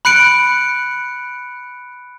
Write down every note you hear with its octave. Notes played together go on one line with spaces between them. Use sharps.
B5 F#6 C#7 D7